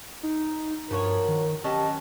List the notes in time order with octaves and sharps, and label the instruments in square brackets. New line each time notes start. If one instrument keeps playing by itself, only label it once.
[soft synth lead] D#4
[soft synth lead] G2 [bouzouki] F3 F#4 C#5 [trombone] A#4
[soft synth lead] D#3
[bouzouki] F#3 C#4 A5 [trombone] G4 [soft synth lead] D#5